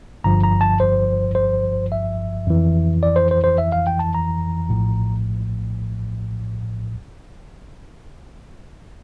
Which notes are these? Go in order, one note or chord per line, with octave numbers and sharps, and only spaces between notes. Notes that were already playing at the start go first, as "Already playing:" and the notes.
G1 G2 F3 A#5
A#5
A5
C5
C5
E5
F2 E3
D5
C5
C5
C5
E5
F5
G5
A5
A#5
A#1 A2 F3